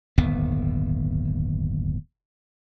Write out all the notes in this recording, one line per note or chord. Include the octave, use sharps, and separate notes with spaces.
D1 G1 D#2 B3